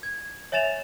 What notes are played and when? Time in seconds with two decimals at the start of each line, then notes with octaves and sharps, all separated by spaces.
0.03 G#6
0.52 C#5 E5 G#5 A6 E7 F7